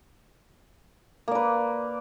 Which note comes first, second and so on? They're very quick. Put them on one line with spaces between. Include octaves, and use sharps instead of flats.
A#3 D5 B4